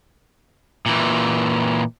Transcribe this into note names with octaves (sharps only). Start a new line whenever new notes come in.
A#2 E3